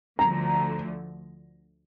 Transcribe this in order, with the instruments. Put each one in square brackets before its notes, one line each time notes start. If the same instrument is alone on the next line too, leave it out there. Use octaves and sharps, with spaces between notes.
[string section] D2 D3 F3 A3 [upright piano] A#5